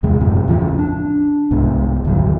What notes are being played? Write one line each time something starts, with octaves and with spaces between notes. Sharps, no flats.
E2 C3 G#3
F#2 A2 C3 F#3
A1 E2 C#3 F3
D4
C2 G#2 B3
D#1 G#1 D3 F#3